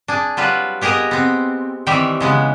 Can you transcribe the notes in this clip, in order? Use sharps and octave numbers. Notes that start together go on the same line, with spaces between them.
D4 G#4
F#3 G3 F4 B4
B3 G4 G#4 A#4 D#5
B3 C4
D#3 E3 G3 C4 G4 E5
C#3 G#3 B3